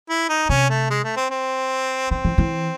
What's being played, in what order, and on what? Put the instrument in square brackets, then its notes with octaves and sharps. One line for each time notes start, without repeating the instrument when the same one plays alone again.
[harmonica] E4
D#4
[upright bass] C3 [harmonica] C#4
[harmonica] A3
G#3
A3
C4
C4
[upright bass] D#3 [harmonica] C4
[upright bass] E3
E3